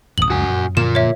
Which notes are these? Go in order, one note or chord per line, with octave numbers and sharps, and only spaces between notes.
D#1 A1 F2 D#6 F#7
C#2 F#2 F#4 G#5
A#2
A#2 D3 F3 F4 A#4 E7
C#5 E5